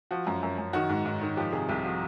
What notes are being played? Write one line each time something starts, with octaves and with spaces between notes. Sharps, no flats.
F3 F#4
F#2
F#2
F#2
D#3 F#4
G#2
G#2
D#3
F3 G4
C3 G#4
C2 G4
F3 F#4